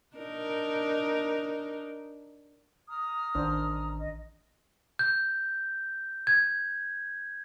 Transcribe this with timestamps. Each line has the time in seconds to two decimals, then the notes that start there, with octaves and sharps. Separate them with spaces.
0.16 D4 D#4 A#4
2.89 A#5 D#6 F6
3.35 A1 D#3 D4 C5
3.96 D#5
4.99 G6
6.27 G#6